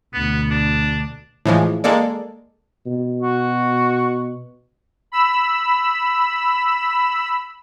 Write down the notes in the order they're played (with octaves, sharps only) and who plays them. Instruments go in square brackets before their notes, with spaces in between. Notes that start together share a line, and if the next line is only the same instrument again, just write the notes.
[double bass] D2 B2 [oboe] B3
[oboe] D4
[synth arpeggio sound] A2 E3 F3 G#3
G#3 A#3 A4 D5
[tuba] B2
[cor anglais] F#4
[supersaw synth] B5 E6